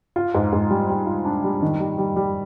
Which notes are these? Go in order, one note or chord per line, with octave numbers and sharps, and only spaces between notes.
F4
G#2
G#2
G3
G3
F4
D4
G3
D#3
G3
G3
G3